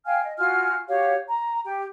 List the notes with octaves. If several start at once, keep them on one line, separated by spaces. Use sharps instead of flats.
F5 G5 G#5 F6
D#5
F4 F#4 G#5 F6
F#4 G4 C#5 F5
A#5
G4 G5